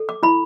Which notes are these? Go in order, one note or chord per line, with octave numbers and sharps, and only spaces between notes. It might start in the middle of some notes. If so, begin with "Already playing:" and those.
Already playing: A4
D6
E4 B5